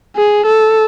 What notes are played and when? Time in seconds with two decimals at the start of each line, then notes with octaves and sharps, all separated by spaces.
0.16 G#4
0.46 A4